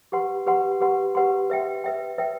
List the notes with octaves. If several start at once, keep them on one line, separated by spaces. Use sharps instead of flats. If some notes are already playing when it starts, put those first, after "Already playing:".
G4 B4 F#5 C6
G4 B4 F#5 C6
G4 B4 F#5 C6
G4 B4 F#5 C6
B4 E5 G5
B4 E5 G5
B4 E5 G5